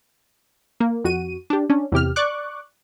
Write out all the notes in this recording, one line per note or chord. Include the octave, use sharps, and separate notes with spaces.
A#3
F2 F#4 D#7
D4 G4
C#4 D4
E2 C3 G4 F6
D5 C#6 D6 F#6